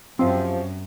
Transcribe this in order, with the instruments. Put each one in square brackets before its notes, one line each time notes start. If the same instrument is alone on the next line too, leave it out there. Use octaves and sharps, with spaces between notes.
[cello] F#2 [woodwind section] C3 F3 [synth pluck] C4